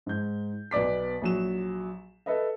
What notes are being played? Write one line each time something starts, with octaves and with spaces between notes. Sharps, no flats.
G#2 G6
B1 B3 D5 D6 B6
A#1 F#3 E7
A4 B4 D#5 E5